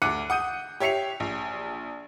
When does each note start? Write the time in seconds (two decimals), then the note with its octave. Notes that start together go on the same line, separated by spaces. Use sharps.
0.02 D2 D6 F#6 C#7 D#7
0.30 F#5 D#6 G6 D#7
0.80 G4 C#5 E5 C7 C#7 F7
1.20 A#1